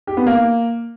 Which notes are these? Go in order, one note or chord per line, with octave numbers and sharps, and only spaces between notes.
G4
B3
A#3